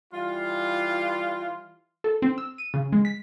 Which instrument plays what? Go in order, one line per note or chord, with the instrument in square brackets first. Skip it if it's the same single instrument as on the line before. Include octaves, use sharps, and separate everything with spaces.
[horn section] E3 G3 F4
[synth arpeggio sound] A4
C4
E6
D#7
C#3
G#3
B6